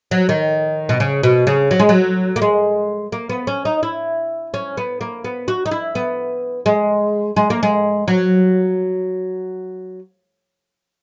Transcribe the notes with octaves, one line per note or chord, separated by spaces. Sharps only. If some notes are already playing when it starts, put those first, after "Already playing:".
F#3
D#3
B2
C#3
B2
C#3
F#3
G#3
F#3
A#3
G#3
A#3
B3
C#4
D#4
E4
C#4
B3
A#3
B3
F#4
D#4
E4
B3
G#3
G#3
A#3
G#3
F#3